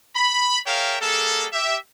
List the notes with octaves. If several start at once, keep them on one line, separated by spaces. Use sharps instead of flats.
B5
G#4 A#4 C#5 E5 F5 G5
G3 A#3 G#4 A4
G4 E5